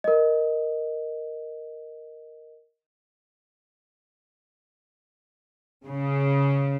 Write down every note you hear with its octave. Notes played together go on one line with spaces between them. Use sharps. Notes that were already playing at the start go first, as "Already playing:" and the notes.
A#4 D#5
C#3